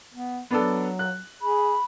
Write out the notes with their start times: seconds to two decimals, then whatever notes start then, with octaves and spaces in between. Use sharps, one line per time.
0.14 B3
0.51 F#3 B3 D4 A4
0.99 F#6
1.42 G#4 B5